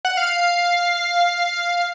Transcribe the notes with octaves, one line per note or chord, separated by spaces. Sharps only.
F#5
F5